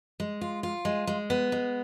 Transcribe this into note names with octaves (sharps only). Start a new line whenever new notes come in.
G#3
F4
F4
G#3
G#3
B3
G#3